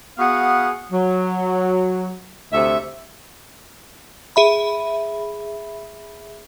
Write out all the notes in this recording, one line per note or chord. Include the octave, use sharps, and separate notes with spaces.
B3 F#4 G#4 F5 F#5
F#3
D2 C3 A4 E5
G#4 E5 B5